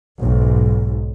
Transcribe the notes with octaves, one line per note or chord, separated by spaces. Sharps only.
B1 G#2